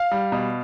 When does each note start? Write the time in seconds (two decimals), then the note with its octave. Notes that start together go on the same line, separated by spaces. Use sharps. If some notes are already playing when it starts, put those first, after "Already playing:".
Already playing: F5
0.11 G3
0.32 B2